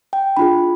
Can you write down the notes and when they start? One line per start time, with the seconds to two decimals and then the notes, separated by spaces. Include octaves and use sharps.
0.13 G5
0.37 D4 F4 G#4 B5